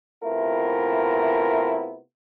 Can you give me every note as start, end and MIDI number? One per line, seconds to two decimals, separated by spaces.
0.23 1.98 48
0.23 1.98 57
0.23 1.98 59
0.23 1.98 64
0.23 1.98 65
0.23 1.98 70